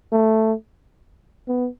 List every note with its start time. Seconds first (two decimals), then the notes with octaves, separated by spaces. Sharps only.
0.12 A3
1.48 B3